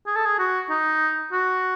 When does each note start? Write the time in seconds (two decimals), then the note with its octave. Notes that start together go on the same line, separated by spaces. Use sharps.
0.07 G#4
0.16 A4
0.25 G#4
0.39 F#4
0.70 D#4
1.33 F#4